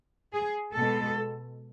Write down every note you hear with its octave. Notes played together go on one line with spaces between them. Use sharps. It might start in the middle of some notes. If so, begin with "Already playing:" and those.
G#4
B2 G#3 A4